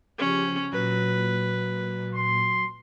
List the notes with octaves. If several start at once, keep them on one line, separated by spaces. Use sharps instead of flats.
C#3 F3 C#4 G4
A#2 F#3 B4
C6